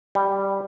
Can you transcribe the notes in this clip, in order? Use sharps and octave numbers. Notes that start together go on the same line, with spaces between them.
G3